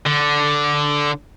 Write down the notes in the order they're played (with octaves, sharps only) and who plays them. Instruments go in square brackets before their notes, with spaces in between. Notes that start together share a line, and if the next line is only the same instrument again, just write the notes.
[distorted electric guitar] D3